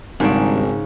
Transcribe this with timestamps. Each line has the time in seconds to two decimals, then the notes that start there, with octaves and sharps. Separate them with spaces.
0.20 G#1 D#2 G#2 C#3 G3 D4